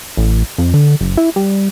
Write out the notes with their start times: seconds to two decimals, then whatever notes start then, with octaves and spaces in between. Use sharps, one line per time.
0.17 A1
0.58 F2
0.74 D3
1.01 F#1
1.17 E4
1.36 G3